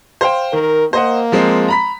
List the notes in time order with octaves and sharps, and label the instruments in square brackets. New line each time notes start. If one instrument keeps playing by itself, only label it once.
[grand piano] C5 F5 G5
[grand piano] D#3 [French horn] A#4
[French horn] A#3 [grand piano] C5 D#5 F#5
[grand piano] F3 G#3 C4
A#5 B5 B6